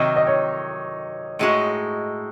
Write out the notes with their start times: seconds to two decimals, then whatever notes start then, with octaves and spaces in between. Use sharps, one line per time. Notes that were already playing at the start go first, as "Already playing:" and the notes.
Already playing: C3 D#3 F#3 D#5
0.16 D#5
0.27 C#5
1.39 A2 G#3 D#4 F#4